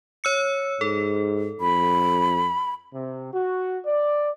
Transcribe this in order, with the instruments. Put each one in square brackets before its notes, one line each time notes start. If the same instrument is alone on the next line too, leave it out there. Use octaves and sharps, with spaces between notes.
[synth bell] C#5 E6 C#7
[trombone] G#2 [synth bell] A4
[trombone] F2 [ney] B5
[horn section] C3
F#4
D5